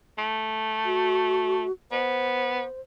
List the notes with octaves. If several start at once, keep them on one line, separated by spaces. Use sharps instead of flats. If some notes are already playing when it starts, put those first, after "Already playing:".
A3
F#4
B3 C5